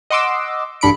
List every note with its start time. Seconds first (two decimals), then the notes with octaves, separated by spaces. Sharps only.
0.10 D#5 F#5 C6 D6 E6
0.81 A1 G2 D4 B5 C#7 D7